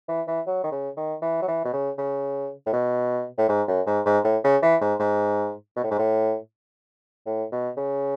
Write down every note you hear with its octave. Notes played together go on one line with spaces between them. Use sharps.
E3
E3
F#3
D#3
C#3
D#3
E3
F#3
E3
B2
C#3
C#3
A2
B2
A2
G#2
F#2
G#2
G#2
A2
C#3
E3
G#2
G#2
B2
A2
G#2
A2
A2
B2
C#3